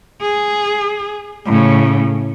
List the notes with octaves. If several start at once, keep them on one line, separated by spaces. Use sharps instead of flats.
G#4
A2 C#3